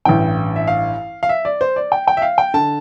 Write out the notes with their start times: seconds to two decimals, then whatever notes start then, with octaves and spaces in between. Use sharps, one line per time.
0.05 A1 G2 E3 G5
0.56 E5
0.68 F5
1.23 F5
1.29 E5
1.45 D5
1.61 C5
1.76 D5
1.92 G5
2.08 G5
2.17 E5
2.22 F5
2.38 G5
2.54 D3 A5